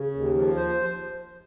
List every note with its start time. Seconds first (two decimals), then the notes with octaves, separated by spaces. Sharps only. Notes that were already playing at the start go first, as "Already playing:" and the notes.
Already playing: C#3
0.15 D#2
0.35 F3
0.56 C5